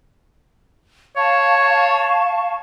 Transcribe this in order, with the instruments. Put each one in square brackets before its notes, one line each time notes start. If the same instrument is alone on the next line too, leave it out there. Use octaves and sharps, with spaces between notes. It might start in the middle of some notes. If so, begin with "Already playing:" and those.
[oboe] C#5 [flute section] F5 A5 C#6